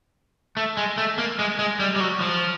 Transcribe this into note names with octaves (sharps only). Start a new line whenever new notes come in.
A3
G#3
A3
A#3
G#3
G#3
G3
G3
F#3
F3